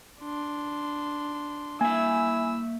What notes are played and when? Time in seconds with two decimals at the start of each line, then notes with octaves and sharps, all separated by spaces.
0.21 D4 C6
1.81 A#3 E4 E5 G#5 E6